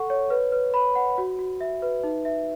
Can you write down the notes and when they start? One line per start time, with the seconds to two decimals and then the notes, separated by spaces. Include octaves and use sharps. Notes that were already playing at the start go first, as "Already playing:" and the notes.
Already playing: A4 F#5 C#6
0.10 C#5
0.30 B4
0.52 B4
0.74 B5
0.95 F#5
1.18 F#4
1.39 F#4
1.61 E5
1.82 B4
2.04 D#4
2.25 E5